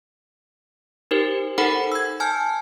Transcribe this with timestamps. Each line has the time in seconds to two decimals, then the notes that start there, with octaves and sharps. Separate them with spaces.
1.11 D#4 G4 A#4 C5
1.58 D#4 A4 A#4 C5 F#5 B5
1.92 E6 G#6
2.20 G#5 A5 F6 G6